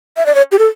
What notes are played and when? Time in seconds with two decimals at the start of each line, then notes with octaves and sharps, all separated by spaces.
0.17 E5
0.26 D5
0.35 C#5
0.52 G4
0.59 A4